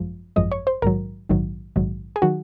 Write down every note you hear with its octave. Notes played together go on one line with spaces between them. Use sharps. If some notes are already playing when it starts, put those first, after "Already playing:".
Already playing: G#1 F#2 F3 G#3
G#1 F#2 F3 G#3 D#5
C#5
C5
A#1 G#2 D#3 F#3 A#4
A#1 G#2 D#3 F#3
A#1 G#2 D#3 F#3
G#4
D#3 F#3 F#4